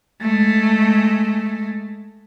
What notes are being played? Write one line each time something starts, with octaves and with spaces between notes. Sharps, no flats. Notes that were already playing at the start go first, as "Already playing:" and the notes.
G#3 A3